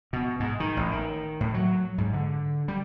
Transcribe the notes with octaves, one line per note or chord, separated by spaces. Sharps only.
B2
G#2
D#3
A1
D#3
A2
F#3
G#2
D3
G3